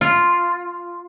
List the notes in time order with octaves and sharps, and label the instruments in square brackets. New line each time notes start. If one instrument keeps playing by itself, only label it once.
[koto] F4